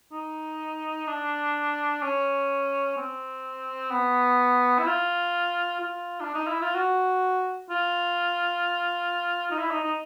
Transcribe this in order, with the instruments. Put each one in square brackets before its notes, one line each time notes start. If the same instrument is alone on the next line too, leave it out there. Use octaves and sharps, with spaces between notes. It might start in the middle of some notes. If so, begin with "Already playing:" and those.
[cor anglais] D#4
D4
C#4
C4
B3
E4
F4
F4
D4
D#4
E4
F4
F#4
F4
D#4
E4
D#4
D#4